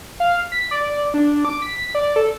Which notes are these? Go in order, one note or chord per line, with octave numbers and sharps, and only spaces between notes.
F5
B6
D5
D4
D6
B6
D5
A4